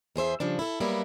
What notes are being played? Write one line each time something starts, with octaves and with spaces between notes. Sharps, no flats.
E2 G#4 C5 E5
C#3 F3 G3 D4
E4 A4
F#3 G3 A#3 B3 E4